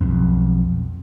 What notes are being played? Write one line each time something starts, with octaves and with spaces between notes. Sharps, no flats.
B1 F2